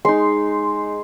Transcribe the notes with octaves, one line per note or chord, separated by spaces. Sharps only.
G#3 D#4 C6